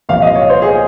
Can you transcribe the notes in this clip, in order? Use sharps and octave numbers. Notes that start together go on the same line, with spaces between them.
C2 A#2 F3 F5
D#5
C#5
C5
G#4